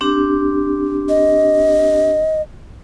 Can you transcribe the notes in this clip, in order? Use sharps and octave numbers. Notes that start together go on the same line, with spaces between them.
C4 D4 G4
D#5